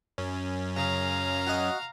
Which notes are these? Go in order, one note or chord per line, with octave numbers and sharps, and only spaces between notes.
F#2 C#4
C#3 F5 A#5
F#4 D#5